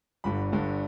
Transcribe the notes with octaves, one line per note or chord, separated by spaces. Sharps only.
G1 G2 D3 B5
G1 G2 D3